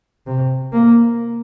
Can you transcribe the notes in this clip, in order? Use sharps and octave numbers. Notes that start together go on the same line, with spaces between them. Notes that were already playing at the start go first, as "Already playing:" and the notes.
C3
A#3